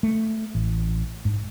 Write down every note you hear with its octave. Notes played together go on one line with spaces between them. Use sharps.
A3
A1
G#2